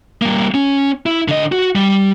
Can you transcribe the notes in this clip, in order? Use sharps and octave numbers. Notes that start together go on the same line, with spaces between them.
G3 A#3
C#4
E4
D3 D#5
F#4
G3